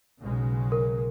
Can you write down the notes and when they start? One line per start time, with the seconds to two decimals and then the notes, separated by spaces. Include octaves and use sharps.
0.21 B1 C#3 G#3
0.72 A#4